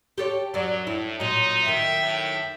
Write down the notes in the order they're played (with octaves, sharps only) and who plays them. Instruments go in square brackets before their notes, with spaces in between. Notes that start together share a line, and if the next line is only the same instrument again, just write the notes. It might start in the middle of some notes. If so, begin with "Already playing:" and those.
[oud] G4 A4 C#5
[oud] F#2 D5 [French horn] F#3
[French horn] A2 [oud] E4
[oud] A#2 F#3 [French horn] D#4
[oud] F#2 D#3 [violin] E5 G5
[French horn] A2